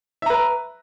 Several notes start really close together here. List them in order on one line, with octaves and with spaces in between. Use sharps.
E5 A#5 B4